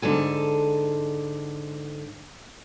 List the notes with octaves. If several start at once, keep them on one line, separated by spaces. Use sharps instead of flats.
G#2 D3 A4 G#5